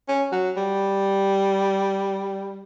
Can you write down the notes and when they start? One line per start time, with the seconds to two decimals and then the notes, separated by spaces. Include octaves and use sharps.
0.08 C#4
0.32 F#3
0.57 G3